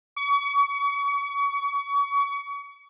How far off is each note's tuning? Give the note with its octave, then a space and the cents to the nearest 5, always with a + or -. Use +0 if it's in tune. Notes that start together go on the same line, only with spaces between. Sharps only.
C#6 +35